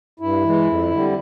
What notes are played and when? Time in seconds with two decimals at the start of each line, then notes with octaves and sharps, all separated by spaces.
0.20 G2 E4
0.44 E3 G#3
0.67 F2
0.91 D3 G3